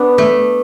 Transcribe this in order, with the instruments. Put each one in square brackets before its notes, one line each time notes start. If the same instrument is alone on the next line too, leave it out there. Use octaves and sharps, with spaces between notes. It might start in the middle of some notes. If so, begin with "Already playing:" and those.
Already playing: [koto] B3 D4
A3